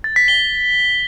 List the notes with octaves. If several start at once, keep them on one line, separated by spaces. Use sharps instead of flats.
A6
B6
G7